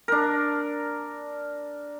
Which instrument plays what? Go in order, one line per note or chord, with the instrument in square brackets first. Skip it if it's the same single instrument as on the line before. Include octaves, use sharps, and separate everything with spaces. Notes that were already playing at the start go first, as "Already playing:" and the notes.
[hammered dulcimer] D4 A#4